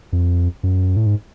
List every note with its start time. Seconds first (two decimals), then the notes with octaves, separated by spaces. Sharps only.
0.13 F2
0.63 F#2
0.97 A2
1.06 G#2